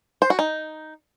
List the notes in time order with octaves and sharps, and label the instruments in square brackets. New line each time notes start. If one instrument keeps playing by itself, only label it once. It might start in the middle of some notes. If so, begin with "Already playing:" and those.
[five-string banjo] C5
F#4
D#4